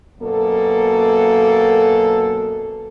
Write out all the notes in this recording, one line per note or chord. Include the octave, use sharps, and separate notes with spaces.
F#2 B2 A#3 A4